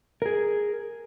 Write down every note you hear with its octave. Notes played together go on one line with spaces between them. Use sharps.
G#4 A#4